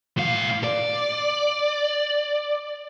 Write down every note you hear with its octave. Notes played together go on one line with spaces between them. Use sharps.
A2 F5
D5